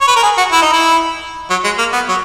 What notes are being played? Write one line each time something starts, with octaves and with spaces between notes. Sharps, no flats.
C#5
B4
A#4
G#4
F#4
E4
D#4
E4
F#3
G#3
A#3
B3
F#3